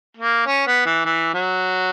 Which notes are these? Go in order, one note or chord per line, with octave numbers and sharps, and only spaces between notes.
A#3
C#4
B3
E3
E3
F#3